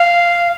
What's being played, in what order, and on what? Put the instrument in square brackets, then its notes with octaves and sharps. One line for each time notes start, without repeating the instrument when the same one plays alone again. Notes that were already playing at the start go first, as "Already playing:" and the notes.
Already playing: [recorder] F5